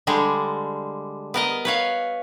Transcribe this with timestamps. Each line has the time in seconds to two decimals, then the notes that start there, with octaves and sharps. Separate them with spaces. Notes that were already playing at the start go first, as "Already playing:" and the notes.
0.07 D3 G3 G#3
1.34 B3 A#4 D#5
1.65 B4 C#5 F5